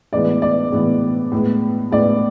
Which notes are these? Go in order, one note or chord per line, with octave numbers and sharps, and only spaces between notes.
A2 E3 G#3 B3 D5
D5
A2 E3 G#3 B3
A2 G#3 B3
A2 G#3 B3 D5